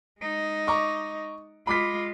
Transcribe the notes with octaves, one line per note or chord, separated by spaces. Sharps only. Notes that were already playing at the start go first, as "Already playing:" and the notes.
G#3 D#4
A#5 C#6 D6
G#3 F4 B5 D6 B6